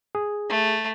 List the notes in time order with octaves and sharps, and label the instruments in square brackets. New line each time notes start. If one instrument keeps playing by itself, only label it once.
[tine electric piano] G#4
[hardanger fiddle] A3